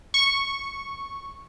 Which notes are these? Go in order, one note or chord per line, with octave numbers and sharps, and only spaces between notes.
C#6